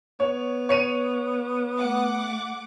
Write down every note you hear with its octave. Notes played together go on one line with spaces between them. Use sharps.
B3 C#5
C#5 C#7 D#7
A3 F#5 D6